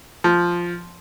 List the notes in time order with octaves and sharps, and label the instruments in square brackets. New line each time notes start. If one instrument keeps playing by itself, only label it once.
[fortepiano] F3